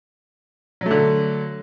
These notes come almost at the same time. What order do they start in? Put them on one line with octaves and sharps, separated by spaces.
F#3 A3 D3